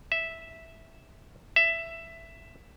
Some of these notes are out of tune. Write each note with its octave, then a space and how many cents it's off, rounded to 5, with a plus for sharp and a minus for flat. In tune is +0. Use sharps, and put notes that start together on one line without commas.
E5 -5
E5 +10